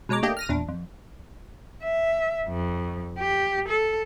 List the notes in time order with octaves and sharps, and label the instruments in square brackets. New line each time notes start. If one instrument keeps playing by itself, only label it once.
[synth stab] B2 G#3 C#5 A#5 D6
A3 A#3 D4 G4 D#5 G5
F6 A#6 D#7
E2 A#2 D4
F2
[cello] E5
F2
G4
A4